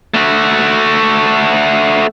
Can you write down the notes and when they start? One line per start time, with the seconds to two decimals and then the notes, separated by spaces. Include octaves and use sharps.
0.14 A3 F#4